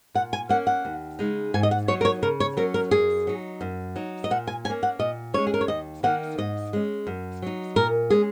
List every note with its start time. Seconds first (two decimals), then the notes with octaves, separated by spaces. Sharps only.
0.15 A#2 F#5
0.33 G#5
0.49 A#3 C#4 F#5
0.67 F#5
0.85 D#2
1.19 C#3 G#3 D#4
1.54 G#2 G#5
1.63 D#5
1.71 F#5
1.88 F#3 D#4 C#5
2.01 A#4
2.05 C#5
2.23 C#3 A#4
2.40 C#5
2.57 F#3 C#4 A#4
2.74 A#4
2.91 F#2 G#4
3.27 F#3 D#4
3.61 F#2
3.96 F#3 D#4
4.24 D#5
4.31 A#2 F#5
4.47 G#5
4.65 C#4 G#5
4.70 A#3
4.83 F#5
4.99 A#2 D#5
5.34 G#3 C#4 C#5
5.47 G#4
5.54 A#4
5.61 C#5
5.68 D#2 D#5
6.03 D#3 A#3 D#4 F#5
6.38 G#2 D#5
6.73 G#3 C#4
7.07 F#2
7.42 F#3 D#4
7.76 A#2 A#4
8.10 G#3 C#4 G#4